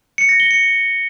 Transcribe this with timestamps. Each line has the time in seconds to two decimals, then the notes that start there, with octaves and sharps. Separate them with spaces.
0.18 C#7
0.29 A#6
0.40 G7
0.51 C#7